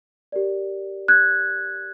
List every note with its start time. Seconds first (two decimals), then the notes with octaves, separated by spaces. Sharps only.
0.32 G4 A#4 D5
1.08 F#6 G#6